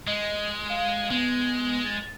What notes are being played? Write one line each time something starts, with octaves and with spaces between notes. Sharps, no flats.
G#3 D#5
F5
G#3 B3
A6